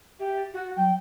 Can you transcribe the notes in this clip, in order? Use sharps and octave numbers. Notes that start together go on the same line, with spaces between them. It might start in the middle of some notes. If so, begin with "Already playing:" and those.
G4 E5
A6
F#4
F#3 G5